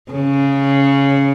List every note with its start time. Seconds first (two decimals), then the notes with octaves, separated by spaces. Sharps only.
0.12 C#3